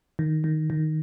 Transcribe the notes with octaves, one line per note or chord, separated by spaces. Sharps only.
D#3
D#3
D#3